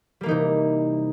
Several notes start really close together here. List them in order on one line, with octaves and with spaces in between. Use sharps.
G3 A#3 E3 D#4 C3